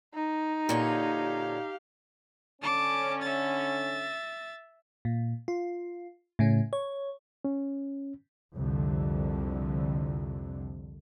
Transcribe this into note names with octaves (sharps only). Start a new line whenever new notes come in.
D#4
A#2 D3 G4 C#5 F5
D3 C#4 A5 D6
E5 A6
A#2
F4
A2 C#3 C#4
C#5
C#4
C2 F2 D3